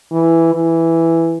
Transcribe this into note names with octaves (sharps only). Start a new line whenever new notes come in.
E3
E3